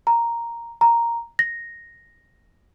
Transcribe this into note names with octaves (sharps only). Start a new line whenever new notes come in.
A#5
A#5
A#6